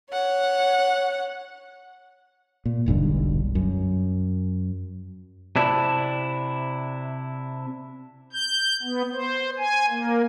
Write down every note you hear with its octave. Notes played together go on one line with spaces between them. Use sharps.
C#5 F#5
A#2
E1 B1 G2 D3
F#2
C3 D4 E4
G6
B3
C5
G#5
A#3